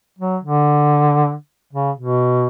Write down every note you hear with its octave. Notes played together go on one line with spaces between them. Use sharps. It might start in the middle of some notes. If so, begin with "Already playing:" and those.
F#3
D3
C#3
B2